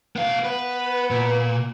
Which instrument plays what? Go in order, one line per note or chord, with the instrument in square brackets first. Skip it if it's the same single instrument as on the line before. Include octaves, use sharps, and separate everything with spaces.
[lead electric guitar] B3 F5
[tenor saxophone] B3 [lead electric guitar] B4
[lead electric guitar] A#2